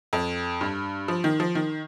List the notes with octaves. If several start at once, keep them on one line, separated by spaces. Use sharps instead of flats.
F2
G2
F3
D#3
F3
D#3